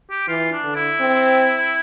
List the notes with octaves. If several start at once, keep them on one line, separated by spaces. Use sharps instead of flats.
G4
E3 F4
D4
D3
E4
C4